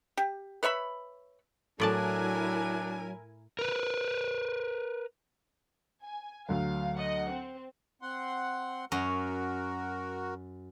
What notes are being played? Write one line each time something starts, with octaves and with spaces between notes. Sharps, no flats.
G4
B4 C#5 E5 B5
A2 F#3 D4 E4 A#4 D5 G#5 A5
A#4 B4
G#5
D2 F#3 F5
D#5 F#5
C4
C4 F#5 C6
F#2 F#4 A#4 C#5 A#5